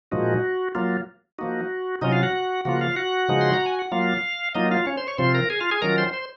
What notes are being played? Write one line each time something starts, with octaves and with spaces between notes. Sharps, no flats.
A#2 F3 G#3 D#4 F#4
F#3 A#3 F4
F3 A#3 D#4 F#4
C3 F#3 C#4 D#4 F4 D#5
F4 F5
F#4 F#5
C#3 F3 A#3 F4 F#4 F#5
F4 F5
F#4 F#5
C#3 F3 G#3 D#4
C6
A#5
G#5
F#5
F#3 A#3 F4 F5
F#3 A#3 D#4 F4 D#5
F4 F5
C#4 C#5
C5 C6
C#5 C#6
C3 F3 C4 F4 C5 C6
A#4 A#5
G#4 G#5
F4 F5
G#4 G#5
D#3 F#3 C#4 F4 A#4 A#5
C5 C6
C5 C6